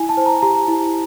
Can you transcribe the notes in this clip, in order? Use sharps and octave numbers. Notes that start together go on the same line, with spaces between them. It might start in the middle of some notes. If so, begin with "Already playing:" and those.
Already playing: E4 G#5
A5
C5
A#5
G4 A#5
E4